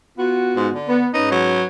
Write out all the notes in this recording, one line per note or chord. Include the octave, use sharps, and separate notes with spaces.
B3 F4 F#4
G#2
D3
B3
G#2 C#4 D#4 B4
F#3